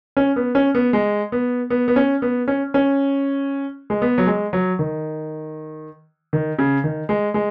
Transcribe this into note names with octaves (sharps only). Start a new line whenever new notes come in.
C#4
B3
C#4
B3
G#3
B3
B3
B3
C#4
B3
C#4
C#4
G#3
B3
F#3
G#3
F#3
D#3
D#3
C#3
D#3
G#3
G#3